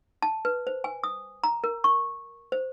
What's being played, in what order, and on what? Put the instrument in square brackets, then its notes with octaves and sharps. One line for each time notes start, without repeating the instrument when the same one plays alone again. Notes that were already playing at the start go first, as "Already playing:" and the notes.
[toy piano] A5
B4
C5
G#5
D#6
A#5
A#4
C#6
C5